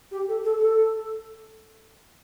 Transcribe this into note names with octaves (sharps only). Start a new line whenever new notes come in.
G4
A4
A4
A4